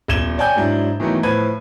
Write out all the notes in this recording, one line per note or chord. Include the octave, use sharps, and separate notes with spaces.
D#1 E2 G#6 E7 G7
C#5 D5 G5 G#5 G6
G#2 F#3 D4 E4
D#3 E3 F#3 A3 B3
A2 F3 B4 G#6 D#7